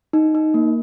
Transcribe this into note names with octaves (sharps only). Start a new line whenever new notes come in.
D#4
D#4
A#3